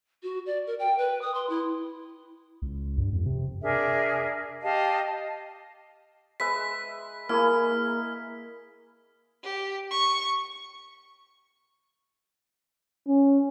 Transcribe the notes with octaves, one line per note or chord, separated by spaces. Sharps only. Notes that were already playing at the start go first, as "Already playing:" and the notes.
F#4
D5
A#4
G5
B4
D#6
C6
E4
C#2
G2
F2
C3
D4 G#4 A#4 E5
G4 D#5 F5 A5
G#3 B4 E5 B6
A#3 E4 G#4 A#4 F6
G4
C#6
C#4